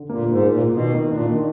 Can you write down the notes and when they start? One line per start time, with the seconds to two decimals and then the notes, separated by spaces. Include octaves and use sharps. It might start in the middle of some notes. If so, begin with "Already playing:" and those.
Already playing: D3
0.09 A#2 A#3
0.25 G#2 F4
0.43 A#3
0.48 A#2
0.60 F4
0.66 A#2
0.72 B2
0.77 D#3
0.94 A#3
1.11 A#2 D4
1.27 D#3